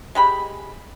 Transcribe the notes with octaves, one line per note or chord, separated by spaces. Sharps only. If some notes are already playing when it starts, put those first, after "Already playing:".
G#3 G4 B5